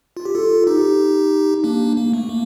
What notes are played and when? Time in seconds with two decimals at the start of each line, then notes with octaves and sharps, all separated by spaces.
0.17 F4
0.25 G4
0.35 F4 A4
0.67 D#4 G4
1.64 A#3 D4
1.97 A#3
2.13 A3
2.29 A#3